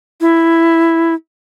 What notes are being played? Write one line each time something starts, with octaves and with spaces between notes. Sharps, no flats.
E4